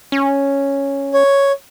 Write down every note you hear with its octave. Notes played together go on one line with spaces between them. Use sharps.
C#4
C#5